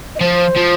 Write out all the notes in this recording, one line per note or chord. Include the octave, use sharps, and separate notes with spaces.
D#5
F3 C5
F3